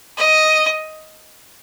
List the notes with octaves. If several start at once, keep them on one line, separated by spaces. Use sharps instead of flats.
D#5